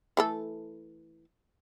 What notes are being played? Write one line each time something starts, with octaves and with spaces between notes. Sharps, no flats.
E3 A3 A4